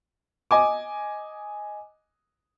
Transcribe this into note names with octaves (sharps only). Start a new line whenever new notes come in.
D#5 G#5 D6